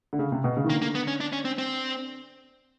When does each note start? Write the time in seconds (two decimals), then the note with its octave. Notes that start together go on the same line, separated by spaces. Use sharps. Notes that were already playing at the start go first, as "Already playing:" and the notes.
0.13 D3
0.19 C#3
0.32 C3
0.44 B2
0.57 C#3
0.64 D#3
0.69 D3 A#3
0.82 A#3
0.95 B3
1.08 C#4
1.21 D4
1.33 C#4
1.45 C4
1.58 C4